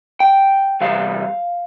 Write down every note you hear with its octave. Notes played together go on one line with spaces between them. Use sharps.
G5
E2 C3 G3 F5